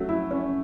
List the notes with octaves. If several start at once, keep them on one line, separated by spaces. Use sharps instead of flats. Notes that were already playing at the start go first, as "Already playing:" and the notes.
Already playing: F#3 A3 C#4
E4
C#4